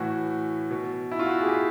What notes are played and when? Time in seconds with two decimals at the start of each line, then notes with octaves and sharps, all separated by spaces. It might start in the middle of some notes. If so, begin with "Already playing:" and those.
Already playing: A2 E3 F#4
0.71 B2
1.11 E4
1.19 F4
1.26 F#4
1.41 G#4
1.46 G4